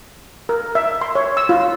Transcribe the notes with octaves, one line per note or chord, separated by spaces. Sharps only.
A#4
E5
C6
C#5
E6
F4